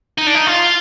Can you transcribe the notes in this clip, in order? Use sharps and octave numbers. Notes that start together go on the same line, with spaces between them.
D#4
D4
D#4
F4